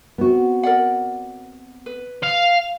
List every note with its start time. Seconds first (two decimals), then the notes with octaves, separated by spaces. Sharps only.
0.18 B3 C4 F#4
0.63 A#4 D5 F#5
1.86 B4
2.23 F5